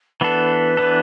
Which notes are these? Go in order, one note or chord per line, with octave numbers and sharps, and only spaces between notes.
E3 B3 D4 A4 B4
E3 B3 D4 A4